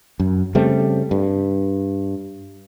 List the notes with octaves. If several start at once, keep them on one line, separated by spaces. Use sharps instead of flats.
F#2
C#3 G3 A3 C4
G2